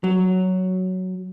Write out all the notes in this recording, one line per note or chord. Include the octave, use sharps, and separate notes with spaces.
F#3